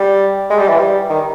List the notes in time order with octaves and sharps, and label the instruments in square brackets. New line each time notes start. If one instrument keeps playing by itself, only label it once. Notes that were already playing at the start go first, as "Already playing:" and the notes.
Already playing: [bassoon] G3
G#3
G3
E3
G3
D#3